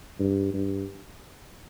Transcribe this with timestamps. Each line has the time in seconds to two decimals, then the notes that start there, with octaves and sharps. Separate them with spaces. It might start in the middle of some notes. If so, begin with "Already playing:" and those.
0.20 G2
0.54 G2